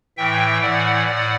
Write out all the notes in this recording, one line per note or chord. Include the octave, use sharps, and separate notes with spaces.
A2 E3 E5 G5
A2 E3 D5 F#5
A2 D5 F#5